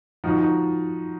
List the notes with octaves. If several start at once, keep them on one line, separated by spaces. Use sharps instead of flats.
F3 D#4 F#4
D#4 F#4